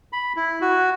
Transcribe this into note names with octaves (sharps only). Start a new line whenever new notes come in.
B5
E4
F#4